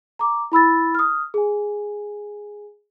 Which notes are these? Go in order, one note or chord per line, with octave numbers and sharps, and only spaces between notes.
A#5 D6
E4 B5 E6 A6
D#6 F6
G#4 G#5